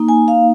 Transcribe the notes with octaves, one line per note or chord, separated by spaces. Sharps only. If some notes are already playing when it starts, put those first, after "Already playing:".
Already playing: A#3 D#4
G#5
F5